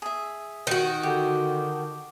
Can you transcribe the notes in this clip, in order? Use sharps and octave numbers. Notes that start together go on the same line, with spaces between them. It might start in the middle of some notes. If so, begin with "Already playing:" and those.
G#4 E5
D#3 F#4
D3 G4